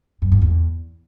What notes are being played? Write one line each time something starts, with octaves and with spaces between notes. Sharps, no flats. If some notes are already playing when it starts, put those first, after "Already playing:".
F#2
G#2
E2